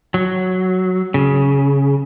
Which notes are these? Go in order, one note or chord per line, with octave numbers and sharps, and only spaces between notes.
F#3
C#3